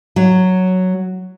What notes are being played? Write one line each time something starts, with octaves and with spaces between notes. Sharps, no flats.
F#3